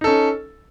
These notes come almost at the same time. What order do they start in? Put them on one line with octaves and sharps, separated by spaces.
D#4 A4 C#4